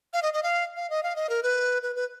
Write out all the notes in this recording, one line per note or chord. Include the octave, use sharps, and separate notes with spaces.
F5
D#5
D#5
F5
F5
D#5
F5
D#5
A#4
B4
B4
B4